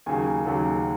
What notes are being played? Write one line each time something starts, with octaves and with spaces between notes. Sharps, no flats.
D#2 C#3 F#3 G#5
D#2 C#3 F#3